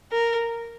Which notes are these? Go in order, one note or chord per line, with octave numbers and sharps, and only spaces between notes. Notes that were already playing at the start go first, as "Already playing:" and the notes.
A#4